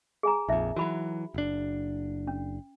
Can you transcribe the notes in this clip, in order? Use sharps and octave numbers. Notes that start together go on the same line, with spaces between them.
G#4 G#5 A#5
A#1 F2 D#4 E5
E3 F#3 F#4 B5
F#1 D4
C#4